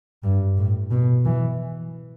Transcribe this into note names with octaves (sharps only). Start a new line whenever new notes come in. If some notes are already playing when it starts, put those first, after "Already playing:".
G2
A2
B2
E3